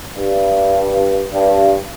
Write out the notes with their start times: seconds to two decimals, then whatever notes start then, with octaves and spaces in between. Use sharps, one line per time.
0.17 G2
1.33 G2